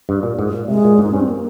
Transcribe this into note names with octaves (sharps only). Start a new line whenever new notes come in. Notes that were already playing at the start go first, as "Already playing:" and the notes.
G2
A#2
G#2
A#2
C3 G#3
A#2
G#2 D#4
G2 C#4
C4
A#3